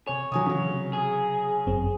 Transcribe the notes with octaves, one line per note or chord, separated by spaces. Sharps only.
C3 C#5 G#5
C3 F#3 G#5 D#6
C#3 F#3
G#4
G1 F#2 C4